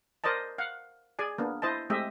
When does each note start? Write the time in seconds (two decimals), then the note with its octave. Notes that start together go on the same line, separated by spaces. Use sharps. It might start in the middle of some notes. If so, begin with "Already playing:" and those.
0.24 A#4 C5 D5 D#5 A5
0.58 F5 F#5
1.19 G#4 D5 G#5
1.38 A#3 B3 D4
1.62 E4 C5 D#5 A5
1.90 G#3 A3 C4 G4 D#5 E5